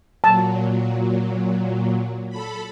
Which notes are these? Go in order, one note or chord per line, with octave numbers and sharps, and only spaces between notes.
A#2 F#3 A5
A4 B5